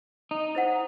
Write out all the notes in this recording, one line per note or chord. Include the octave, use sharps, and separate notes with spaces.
D#4
E4 C5 F#5